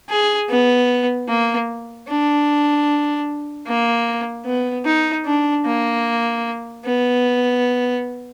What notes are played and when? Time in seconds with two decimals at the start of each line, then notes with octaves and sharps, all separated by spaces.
0.09 G#4
0.49 B3
1.28 A#3
2.08 D4
3.66 A#3
4.46 B3
4.85 D#4
5.26 D4
5.66 A#3
6.85 B3